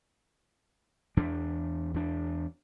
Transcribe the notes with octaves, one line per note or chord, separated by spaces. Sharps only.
E2 D4
E2 D4